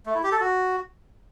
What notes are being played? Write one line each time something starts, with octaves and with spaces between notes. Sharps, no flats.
A3
E4
G4
A4
F#4